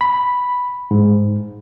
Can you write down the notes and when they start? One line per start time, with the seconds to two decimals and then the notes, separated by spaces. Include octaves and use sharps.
0.01 B5
0.91 G#2